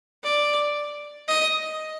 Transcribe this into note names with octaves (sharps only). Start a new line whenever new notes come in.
D5
D#5